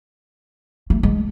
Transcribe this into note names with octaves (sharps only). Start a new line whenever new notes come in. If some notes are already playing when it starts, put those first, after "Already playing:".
A3
G#3